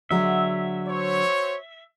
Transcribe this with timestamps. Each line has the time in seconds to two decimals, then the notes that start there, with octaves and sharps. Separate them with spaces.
0.11 D3 F#3 G#3 E5
0.87 F#4 C5 C#5